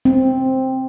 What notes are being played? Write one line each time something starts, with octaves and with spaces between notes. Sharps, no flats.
C4